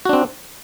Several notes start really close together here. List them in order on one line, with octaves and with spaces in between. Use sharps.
F#4 D4 C4